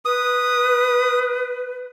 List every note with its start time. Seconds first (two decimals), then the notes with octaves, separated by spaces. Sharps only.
0.05 B4 D#6